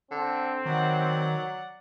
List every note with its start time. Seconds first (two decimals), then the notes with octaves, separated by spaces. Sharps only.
0.11 D3 C4
0.66 D#3 F#3 D5 F#5